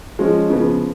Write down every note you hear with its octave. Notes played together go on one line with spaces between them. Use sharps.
F3 G#3 C#4
C#3 F3 B3